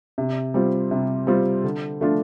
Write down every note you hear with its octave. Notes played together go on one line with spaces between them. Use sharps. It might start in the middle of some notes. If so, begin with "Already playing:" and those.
C3
G3 C4 F4
C3
G3 C4 F4
D3
F3 A3 D4 F4